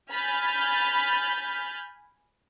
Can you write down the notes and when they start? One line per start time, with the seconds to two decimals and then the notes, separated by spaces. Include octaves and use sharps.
0.12 G#5 B5 F6 G6 A6